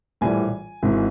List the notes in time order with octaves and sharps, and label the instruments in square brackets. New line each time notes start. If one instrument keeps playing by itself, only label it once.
[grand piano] A#1 A2 E3 G3 G#5
G#1 G#2 E3